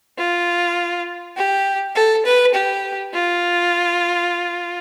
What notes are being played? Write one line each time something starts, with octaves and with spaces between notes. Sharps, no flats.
F4
G4
A4
B4
G4
F4